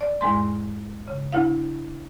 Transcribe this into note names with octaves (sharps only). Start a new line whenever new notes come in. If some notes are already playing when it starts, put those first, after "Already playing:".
D5
E2 G#2 G#3 C6
C#3
D2 E4 F5